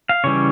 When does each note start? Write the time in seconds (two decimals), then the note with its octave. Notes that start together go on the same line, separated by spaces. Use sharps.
0.09 F5
0.24 C#3 E3 G3 C#4 C#5